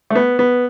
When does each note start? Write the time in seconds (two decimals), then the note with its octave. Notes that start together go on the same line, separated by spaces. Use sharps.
0.10 A3
0.15 B3
0.39 B3